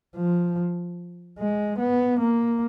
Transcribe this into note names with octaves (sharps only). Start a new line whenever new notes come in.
F3
G#3
B3
A#3